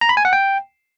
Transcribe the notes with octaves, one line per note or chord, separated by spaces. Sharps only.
A#5
B5
G#5
F#5
G5